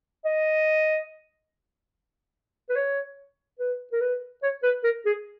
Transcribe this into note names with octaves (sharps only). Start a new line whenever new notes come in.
D#5
B4
C#5
B4
A#4
B4
C#5
B4
A#4
G#4